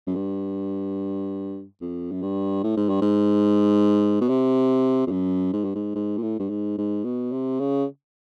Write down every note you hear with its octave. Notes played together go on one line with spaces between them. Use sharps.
F#2
G2
F2
F#2
G2
A2
G#2
G2
G#2
B2
C3
F2
F#2
G#2
G2
G#2
G#2
A#2
A2
G2
G#2
G#2
B2
C3
C#3